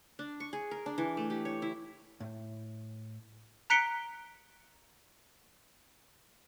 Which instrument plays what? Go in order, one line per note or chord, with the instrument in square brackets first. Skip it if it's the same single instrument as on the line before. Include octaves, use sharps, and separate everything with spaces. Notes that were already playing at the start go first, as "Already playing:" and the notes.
[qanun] D4
C#6
G#4
A#4
D4
E3
A3
G4
C#5
E4
[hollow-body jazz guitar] A2
[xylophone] A#5 F#6 B6 C#7 D7 G7